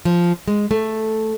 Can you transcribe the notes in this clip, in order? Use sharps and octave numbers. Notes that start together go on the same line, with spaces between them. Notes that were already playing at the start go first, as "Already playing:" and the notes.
F3
G#3
A3